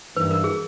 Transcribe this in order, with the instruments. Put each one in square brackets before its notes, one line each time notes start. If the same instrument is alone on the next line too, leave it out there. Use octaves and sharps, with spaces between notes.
[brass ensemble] G2 E3 G3 A#3 [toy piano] B4
[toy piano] A#4
G#4